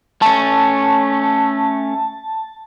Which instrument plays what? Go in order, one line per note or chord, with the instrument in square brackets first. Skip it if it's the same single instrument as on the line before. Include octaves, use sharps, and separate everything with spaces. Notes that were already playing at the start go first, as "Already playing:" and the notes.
[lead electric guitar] A3 C#4 [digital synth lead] A5